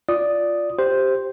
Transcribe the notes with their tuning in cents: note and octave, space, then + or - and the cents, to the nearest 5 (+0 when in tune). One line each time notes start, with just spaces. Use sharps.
F4 +0 D5 -5 D#6 +0
G4 +0 C5 +0